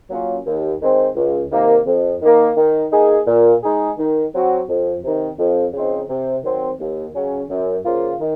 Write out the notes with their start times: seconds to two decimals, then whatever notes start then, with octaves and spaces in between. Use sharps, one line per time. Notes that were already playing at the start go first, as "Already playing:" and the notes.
0.10 F#3 A#3 C#4 F4
0.46 D#2
0.81 D#3 G#3 C4
1.16 C#2
1.51 C3 D#3 A#3
1.86 F2
2.22 D#3 A#3
2.57 D#3
2.92 A#3 D#4 G#4
3.27 A#2
3.63 G#3 D#4 G#4
3.98 D#3
4.33 F#3 C4 F#4
4.68 F2
5.04 C3 D#3
5.38 F2
5.74 C#3 F3 C4 D#4
6.09 C3
6.44 D#3 F#3 C4
6.79 D#2
7.15 C#3 F#3 C#4
7.49 F#2
7.85 C#3 F3 A#3 F4
8.20 D#3